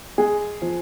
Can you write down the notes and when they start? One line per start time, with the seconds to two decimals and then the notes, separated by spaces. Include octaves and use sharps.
0.18 G#3 G#4
0.62 F3